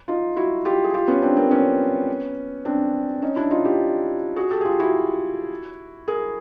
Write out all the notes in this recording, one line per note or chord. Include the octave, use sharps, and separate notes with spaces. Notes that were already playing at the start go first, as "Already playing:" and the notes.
D#4 F4
E4 F#4
F4 G4
G#4
F4 G4
B3 C#4
C4 D4
A#3 C4
B3 C#4
C4 D4
C#4 D#4
D4 E4
D#4 F4
F4 G4
F#4 G#4
G4 A4
G#4
F4 G4
E4 F#4
G#4 A#4